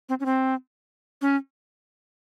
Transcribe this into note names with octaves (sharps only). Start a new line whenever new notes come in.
C4
C#4
C4
C#4